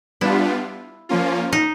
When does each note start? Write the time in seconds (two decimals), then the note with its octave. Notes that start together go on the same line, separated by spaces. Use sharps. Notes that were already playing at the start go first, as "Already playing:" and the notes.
0.21 G3 B3 D4 E4 F4
1.09 F3 A#3 C#4 F4
1.53 D#4